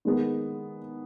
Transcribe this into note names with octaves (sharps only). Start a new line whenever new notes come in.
D#3 G#3 B3